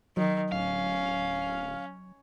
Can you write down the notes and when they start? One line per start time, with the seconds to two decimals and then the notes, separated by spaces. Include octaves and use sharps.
0.17 D#3 F#3
0.52 D1 C#4 F5